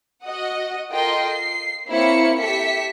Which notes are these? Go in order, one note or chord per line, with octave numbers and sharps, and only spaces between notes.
F#4 D#5 F#5 D#6
F4 A4 A#4 D#5 G5 C6
C7
A#3 C4 E4 C#5 F5 C#7
G4 A4 E5 B6 C#7